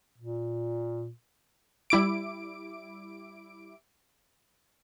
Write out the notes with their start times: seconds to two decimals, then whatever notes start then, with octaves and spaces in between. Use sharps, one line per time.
0.18 A#2
1.90 G3 E4 D6 D7